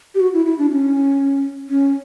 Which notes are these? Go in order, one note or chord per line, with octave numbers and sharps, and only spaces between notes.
G4
F#4
E4
E4
D4
C#4
C#4